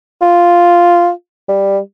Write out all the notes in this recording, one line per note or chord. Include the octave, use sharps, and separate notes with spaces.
F4
G3